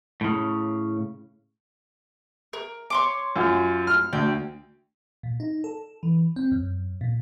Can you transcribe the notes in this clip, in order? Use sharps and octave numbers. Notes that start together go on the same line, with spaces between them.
A2 C#3
A#4
C#5 C6 D6
F#2 F4
F6
D2 G5
A#2
D#4
A4
E3
C4
F#2
A#2